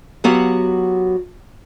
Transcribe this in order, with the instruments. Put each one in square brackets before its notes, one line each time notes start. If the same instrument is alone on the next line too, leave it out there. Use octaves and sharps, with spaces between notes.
[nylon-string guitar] F#3 B3 F#4 G4 F5 F#5